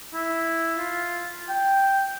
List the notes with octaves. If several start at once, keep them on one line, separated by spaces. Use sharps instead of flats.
E4
F4
G5